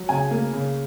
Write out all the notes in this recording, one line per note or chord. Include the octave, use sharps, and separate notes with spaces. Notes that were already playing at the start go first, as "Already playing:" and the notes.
Already playing: F#3
C#3 G#5
A#3
C#3